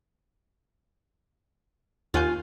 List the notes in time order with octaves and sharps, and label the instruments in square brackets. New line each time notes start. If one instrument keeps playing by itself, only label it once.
[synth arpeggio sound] D#2 F#5 G6 [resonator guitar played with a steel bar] F4 G#5